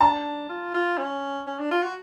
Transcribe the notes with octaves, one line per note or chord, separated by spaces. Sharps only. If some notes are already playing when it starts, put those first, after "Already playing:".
D4 A5
F4
F4
C#4
C#4
D4
F4
F#4